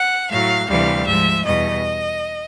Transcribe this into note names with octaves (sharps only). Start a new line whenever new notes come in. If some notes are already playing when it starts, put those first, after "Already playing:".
Already playing: F#5
A2 F#3 F5
D2 C3 E3 G3 F5
G#2 F3 E5
E2 B2 G3 D#5